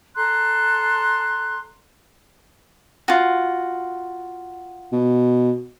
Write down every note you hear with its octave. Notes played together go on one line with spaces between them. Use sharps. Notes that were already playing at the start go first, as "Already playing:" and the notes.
A4 A#5 C6 F#6
F4 F#4
B2